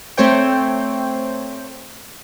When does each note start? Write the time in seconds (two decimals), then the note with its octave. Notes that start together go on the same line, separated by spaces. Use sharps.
0.17 A3 C4 C5 C#5 G5